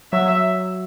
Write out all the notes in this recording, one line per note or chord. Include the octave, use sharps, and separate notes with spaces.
F#3 E5